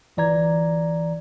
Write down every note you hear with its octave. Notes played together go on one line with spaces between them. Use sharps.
G1 E3 D5 A#5 G#6